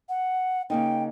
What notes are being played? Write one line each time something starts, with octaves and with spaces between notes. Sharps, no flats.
F#5
C#3 A#3 D#4 G5